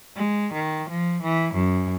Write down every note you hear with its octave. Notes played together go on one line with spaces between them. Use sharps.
G#3
D#3
F3
E3
F#2